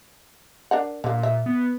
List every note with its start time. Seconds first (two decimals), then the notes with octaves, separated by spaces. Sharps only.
0.71 D4 A#4 F#5
1.04 A#2 D3 A#3
1.23 E5
1.46 B3